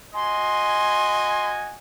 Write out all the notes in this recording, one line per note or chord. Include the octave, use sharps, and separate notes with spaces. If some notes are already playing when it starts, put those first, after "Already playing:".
F#4 D#5 G#5 C6